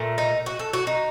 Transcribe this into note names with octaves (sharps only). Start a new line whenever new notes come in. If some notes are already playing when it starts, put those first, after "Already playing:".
Already playing: A#2 A3
D#4
F#4
A4
F#4
D#4